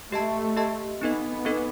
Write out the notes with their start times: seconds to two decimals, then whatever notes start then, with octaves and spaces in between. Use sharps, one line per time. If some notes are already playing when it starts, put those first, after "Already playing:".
0.12 A3 G4 D#5 A5
0.57 G4 D#5 A5
1.01 B3 C4 D#4 A4 D#5
1.45 C4 D#4 A4 D#5